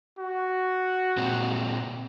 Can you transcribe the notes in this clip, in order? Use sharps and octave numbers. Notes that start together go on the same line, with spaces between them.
F#4
A#2 G#3 C4